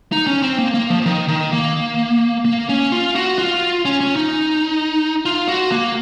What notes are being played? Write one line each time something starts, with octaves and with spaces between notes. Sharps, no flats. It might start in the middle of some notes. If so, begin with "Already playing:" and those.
D#4
C#4
C4
A#3
A#3
F3
D#3
D#3
A#3
A#3
C#4
F4
F#4
F4
C#4
C#4
D#4
F4
F#4
A#3